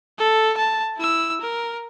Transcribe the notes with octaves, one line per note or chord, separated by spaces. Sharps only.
A4
A5
E4 E6
A#4